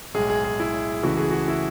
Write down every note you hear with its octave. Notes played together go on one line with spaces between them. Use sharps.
B1 A2 G#3 G#4
G#4
G#4
E4
C#2 C#3 E3 A3 E4 F#4
G#4
F#4
E4